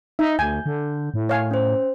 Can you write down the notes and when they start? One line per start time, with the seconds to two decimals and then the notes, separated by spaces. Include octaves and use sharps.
0.19 D#4 E5
0.39 D2 G#5 G6
0.66 D3
1.14 A2
1.29 C#5 F5 G#5
1.51 C#4 C5